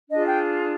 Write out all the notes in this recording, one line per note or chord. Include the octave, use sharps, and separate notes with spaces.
D4 F4 G#4 D#5
G5